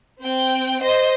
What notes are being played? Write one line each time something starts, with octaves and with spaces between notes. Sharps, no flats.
C4 G5
C5 D#5